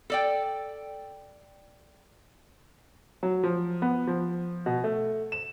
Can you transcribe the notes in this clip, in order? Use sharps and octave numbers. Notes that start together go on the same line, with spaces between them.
A4 D5 G5
F#3
F3
B3
F3
B2
A3
E7